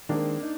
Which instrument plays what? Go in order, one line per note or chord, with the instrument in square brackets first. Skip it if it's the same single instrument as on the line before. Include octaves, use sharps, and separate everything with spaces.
[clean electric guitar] D#3 G#3 C4 [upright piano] A#3 D4
[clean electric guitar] D#4